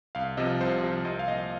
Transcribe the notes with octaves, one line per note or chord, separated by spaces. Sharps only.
C2 F5
C3 F3 D#5
C2 C5
C3 F3
C2 D#5
F5
A#2 F3 D#5